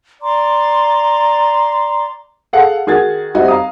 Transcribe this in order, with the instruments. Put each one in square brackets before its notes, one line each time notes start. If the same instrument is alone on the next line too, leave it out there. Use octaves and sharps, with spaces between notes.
[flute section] D5 A#5 C6 D6
[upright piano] G#4 A4 F5 F#5
D#3 F#4 G#4 F#5 G#6 A6
G3 C4 D#4 F#4 D#5 E5
F5 A#5 D#6